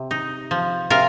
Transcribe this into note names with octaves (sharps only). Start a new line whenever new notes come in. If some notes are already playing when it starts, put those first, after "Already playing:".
Already playing: C3
D#4
F3
C3 F4 A#4